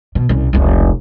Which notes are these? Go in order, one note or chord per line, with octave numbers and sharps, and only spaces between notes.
B2
C2 C#4
F1 C#2